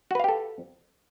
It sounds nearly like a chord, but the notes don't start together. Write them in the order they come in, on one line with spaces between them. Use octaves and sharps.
F#4 B4 F5 G4 A4